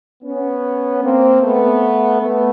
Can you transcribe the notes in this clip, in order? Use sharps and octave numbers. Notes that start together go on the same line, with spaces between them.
B3 C#4
A#3 C4
A3 B3
A3 B3